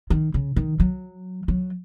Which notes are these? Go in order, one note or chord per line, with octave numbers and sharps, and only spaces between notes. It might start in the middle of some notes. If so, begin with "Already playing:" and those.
D#3
C#3
D#3
F#3
F#3